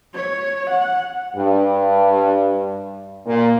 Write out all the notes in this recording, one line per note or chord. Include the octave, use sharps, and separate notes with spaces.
C#5
F#5
G2
A#2